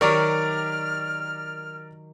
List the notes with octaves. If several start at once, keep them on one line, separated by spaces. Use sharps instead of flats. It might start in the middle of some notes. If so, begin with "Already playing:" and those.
D#3 F#3 G4 A#4 D5 A#5 F6